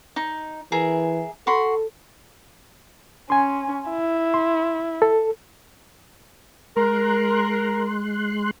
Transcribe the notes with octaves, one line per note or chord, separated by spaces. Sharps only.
D#4
E3 G#4 A#4 E5
F#4 A4 B5 C6
C#4 G#5 C6
E4
C6
A4
G#3 A#4 C6 F#6